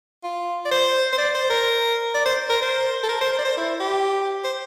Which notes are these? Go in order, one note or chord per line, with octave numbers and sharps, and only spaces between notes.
F4
D5
C5
C5
D5
C5
A#4
D5
C5
A#4
C5
A4
A#4
C5
C5
D5
C5
E4
G4
C5